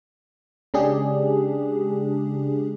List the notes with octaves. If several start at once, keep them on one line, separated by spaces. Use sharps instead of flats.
C#3 G#3 D4 G4 G#4